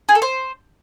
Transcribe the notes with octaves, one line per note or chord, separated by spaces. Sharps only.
G#4
A4
C5